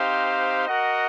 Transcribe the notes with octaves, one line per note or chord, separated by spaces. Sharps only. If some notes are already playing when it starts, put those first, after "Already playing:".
Already playing: C4 D#4 G4 C5 F5
F#4 A#4 D#5 F#5